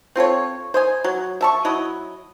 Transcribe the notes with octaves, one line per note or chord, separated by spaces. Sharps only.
C4 F4 A4 C#5
C5 D#5 G#5
F#3
E5 A5 C#6
F#3 E4 D#5